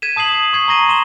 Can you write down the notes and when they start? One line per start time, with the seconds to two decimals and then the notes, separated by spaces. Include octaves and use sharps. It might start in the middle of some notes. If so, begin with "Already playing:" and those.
0.02 G#6 B6 D#7 E7
0.16 A5 D#6 G#6 C7 F#7
0.32 D#6
0.53 C#6 G#6 C7
0.68 A#5 C#6 A#6 D#7
0.88 C6 E7 G7